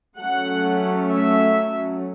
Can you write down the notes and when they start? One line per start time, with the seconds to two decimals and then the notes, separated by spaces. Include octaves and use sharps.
0.20 F#3 A3 C#4 F#5
1.12 E5